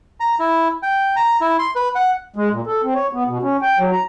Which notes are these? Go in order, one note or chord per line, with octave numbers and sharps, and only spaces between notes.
A#5
E4
G5
A#5
E4
C6
B4
F#5
G#3
A#2
A4
C4
C#5
B3
B2
C#4
G5
F#3
A#5